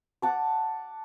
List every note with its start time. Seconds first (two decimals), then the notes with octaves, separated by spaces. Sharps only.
0.22 F#5 A5 D6